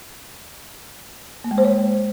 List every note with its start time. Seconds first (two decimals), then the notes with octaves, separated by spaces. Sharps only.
1.44 A#3
1.51 G#3
1.58 C5
1.65 C#5